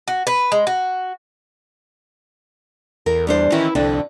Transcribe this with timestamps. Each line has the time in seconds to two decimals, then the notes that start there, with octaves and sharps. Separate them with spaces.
0.08 F#4
0.27 B4
0.52 G#3
0.67 F#4
3.06 E2 A#4
3.27 G3 D4 C5
3.52 D#3 E3 C#4 E4
3.75 C2 F2 D3 D4